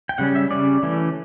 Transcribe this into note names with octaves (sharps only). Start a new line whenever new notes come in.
G5
C#3 G3 C#4 F#5
E5
C#3 G3 C#4 D5
E3 A3 C#4